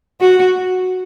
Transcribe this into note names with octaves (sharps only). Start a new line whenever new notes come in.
F#4